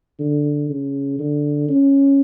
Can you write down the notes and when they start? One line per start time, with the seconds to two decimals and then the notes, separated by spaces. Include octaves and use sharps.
0.19 D3
0.69 C#3
1.20 D3
1.69 C#4